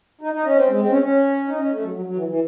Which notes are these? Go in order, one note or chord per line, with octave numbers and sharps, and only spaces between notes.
D#4
D#4
C#4
C4
G#3
C4
C#4
C#4
D#4
C#4
A3
F#3
F#3
F#3
E3
E3